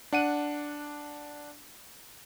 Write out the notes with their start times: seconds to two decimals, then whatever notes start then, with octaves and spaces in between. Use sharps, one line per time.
0.12 D4 F#5 D#7